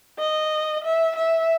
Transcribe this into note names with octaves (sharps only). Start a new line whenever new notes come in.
D#5
E5
E5